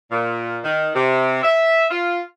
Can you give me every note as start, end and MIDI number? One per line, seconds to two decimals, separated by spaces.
0.11 0.59 46
0.64 0.90 51
0.95 1.41 48
1.43 1.86 76
1.90 2.21 65